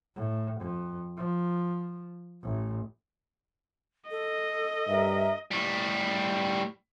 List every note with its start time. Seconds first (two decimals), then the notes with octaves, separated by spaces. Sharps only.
0.16 A2
0.60 F2
1.17 F3
2.43 A1
4.11 A4 D#5
4.87 G2 A#4 E5
5.52 A2 G3